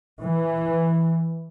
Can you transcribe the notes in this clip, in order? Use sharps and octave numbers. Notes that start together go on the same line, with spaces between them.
E3